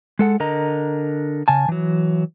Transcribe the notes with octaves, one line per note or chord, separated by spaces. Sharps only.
G#3 A4 F#5
D3 A#4 D#5 A#5
C#3 G#5 A5
E3 F#3